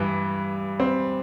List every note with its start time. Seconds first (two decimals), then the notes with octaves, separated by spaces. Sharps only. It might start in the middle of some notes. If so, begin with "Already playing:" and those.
Already playing: G2 E3
0.80 C4